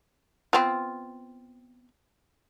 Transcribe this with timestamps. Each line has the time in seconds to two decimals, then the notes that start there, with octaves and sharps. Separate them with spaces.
0.53 B3 C4 F4